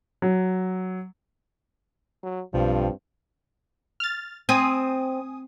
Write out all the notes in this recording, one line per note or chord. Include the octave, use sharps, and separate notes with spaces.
F#3
F#3
B1 G2 F3 C4
F6 A6
C4 G#5 D#6